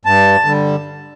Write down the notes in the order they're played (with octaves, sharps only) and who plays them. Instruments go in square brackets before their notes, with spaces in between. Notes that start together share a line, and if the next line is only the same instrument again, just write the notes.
[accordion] G2 A5
D3 G3